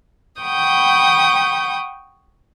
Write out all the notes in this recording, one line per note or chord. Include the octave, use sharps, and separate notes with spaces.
F#5 G5 B5 C#6 D#6 G6